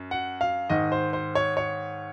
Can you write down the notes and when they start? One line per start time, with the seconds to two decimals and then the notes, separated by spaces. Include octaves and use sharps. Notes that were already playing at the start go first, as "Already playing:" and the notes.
Already playing: F#2
0.11 F#5
0.41 F5
0.70 G#2 D#3 D#5
0.92 C5
1.13 C5
1.35 C#5
1.57 C#5